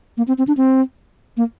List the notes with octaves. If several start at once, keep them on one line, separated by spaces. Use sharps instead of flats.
A#3
C4
C4
D4
C4
A#3